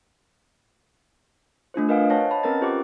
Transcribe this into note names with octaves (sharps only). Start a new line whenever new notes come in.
A3 D4 F4 C5
A#4 B4 D#5 F5 F#5 G#5
C5 C#5 F#5 A5 A#6
D#5 A5 B5
C4 C#4 A#4 B4 A#5 A6
F4 G4 C5 F#5 D6